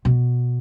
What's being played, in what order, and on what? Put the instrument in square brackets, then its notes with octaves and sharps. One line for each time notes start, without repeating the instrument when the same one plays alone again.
[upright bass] B2